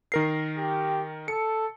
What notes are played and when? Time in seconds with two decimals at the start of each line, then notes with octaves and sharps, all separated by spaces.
0.12 D#3 A#4 C7
0.57 G4
1.28 A4 C#7